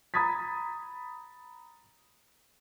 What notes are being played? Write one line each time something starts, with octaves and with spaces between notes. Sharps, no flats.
A#5 B5 D#6 G#6 A6 B6